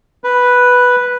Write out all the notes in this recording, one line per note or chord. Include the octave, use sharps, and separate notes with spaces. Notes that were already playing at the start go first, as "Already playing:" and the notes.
B4